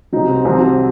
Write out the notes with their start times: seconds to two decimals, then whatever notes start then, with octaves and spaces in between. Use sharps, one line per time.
0.12 C2 C3 F#3 D#4
0.29 C4
0.45 C2 C3 D#3 F#3 C4